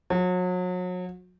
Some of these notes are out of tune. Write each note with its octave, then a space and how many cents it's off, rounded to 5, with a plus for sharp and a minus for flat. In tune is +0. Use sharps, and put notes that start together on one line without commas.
F#3 -35